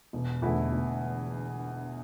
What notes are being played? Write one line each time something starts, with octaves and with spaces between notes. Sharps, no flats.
E1
E2 D3 A3 E4
E1